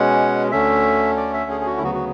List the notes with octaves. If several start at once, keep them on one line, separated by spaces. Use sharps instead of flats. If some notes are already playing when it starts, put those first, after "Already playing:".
Already playing: B2 G#3 C#4 F#5
D2 D3 A3 C#4 E5
D5
E5
G#4
G#4
F#4
E4
D2 C#3 F#3 B3 F#4
F#4